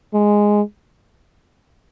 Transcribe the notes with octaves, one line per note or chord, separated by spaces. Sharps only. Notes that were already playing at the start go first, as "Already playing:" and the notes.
G#3